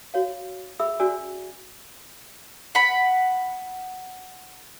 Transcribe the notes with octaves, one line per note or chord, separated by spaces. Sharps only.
F#4 C#5 F5
G#4 E5 B5 E6
C#4 F#4 G#4 D5 G#5 E6
F#5 B5